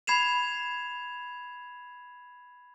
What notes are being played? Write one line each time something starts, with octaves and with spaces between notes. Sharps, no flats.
B5 G#6 C7 E7 F7